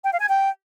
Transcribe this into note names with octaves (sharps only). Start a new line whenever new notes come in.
G5
F5
G#5
G5